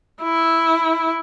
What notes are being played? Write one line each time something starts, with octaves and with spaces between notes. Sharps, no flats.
E4